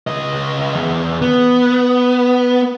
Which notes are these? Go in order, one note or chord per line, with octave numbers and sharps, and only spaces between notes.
C#2 D#5
E2
B3